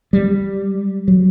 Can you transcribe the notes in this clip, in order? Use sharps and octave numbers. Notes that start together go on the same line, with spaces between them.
G3
F#3